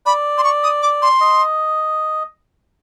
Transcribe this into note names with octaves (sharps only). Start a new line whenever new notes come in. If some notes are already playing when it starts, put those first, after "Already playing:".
D5 B5
C6
C#6
D#6
D6
C6
D#5